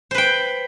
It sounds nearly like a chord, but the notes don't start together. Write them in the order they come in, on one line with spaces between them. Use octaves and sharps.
C5 B4 G5